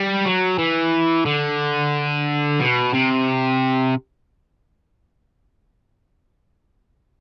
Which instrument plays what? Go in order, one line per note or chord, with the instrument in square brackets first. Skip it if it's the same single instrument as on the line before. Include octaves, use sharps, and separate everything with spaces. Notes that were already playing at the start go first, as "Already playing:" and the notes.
Already playing: [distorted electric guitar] G3
F#3
E3
D3
B2
C3